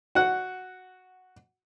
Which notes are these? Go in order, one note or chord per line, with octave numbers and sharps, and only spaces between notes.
F#4 F#5